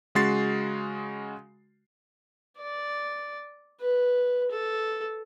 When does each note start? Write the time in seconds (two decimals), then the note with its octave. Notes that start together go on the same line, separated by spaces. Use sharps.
0.15 C#3 G#3 F#4 C6 A6 C7
2.58 D5
3.81 B4
4.51 A4